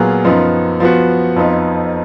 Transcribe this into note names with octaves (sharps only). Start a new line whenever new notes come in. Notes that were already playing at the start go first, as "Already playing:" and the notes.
Already playing: A#2 F#3 B3 F4 G#4
F#2 F3 B3 D#4
F3 B3 F#4
F2 F3 B3 D#4